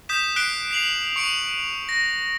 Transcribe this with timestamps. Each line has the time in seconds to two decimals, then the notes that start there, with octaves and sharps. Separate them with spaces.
0.09 D#6 G6 B6 E7
0.36 F#6 B6 C7 D7 G7
0.71 C7 F7 F#7
1.16 C#6 C#7 D7 F7 F#7
1.89 A#6